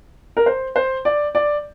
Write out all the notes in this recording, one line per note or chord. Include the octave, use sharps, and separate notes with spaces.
A#4
C5
C5
D5
D5